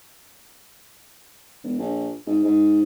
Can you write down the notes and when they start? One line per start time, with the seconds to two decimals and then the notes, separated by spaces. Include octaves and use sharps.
1.63 E1
1.79 A#1
2.27 G#2
2.44 G#2